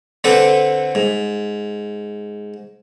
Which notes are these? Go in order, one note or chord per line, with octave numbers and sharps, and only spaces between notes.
D3 C4 A4 B4 G5 D6
G#2